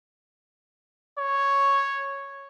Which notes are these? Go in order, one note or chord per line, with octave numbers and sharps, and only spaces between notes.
C#5